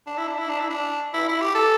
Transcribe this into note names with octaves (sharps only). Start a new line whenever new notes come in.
D4
E4
D4
E4
D4
E4
D4
E4
E4
G4
A4